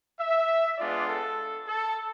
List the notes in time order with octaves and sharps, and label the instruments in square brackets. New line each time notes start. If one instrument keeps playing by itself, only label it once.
[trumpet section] E5
G#3 B3 D4 F4 D5
A4
A4